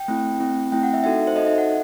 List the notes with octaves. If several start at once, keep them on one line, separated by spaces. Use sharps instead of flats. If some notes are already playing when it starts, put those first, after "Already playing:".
Already playing: G5
A3 C4 E4
A3 C4 E4
A3 C4 E4 G5
F#5
E5
D#4 F#4 A4 E5
C5
D#4 F#4 A4 D#5
E5
F#5